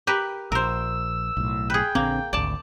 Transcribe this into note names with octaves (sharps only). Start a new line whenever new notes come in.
G4 A#4 B4
A#1 A#4 C5 E6
B1 A2
G#4 B4 G5
A#1 D3 A#3 C4
G#1 D2 D5 A5